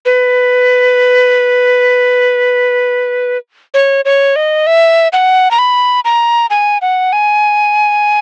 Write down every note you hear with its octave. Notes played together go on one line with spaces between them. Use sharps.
B4
C#5
C#5
D#5
E5
F#5
A#5
B5
A#5
G#5
F#5
G#5